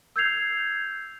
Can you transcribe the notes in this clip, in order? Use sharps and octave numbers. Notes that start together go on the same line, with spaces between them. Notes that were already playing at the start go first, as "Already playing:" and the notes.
E6 G6 G#6 C7 F7